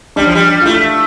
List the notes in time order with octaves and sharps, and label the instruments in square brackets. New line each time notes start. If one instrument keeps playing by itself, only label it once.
[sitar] G3 [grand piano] D4
[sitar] F3
G3
[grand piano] F4
[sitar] A3 [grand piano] E4